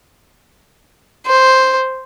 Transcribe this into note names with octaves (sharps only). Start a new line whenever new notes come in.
C5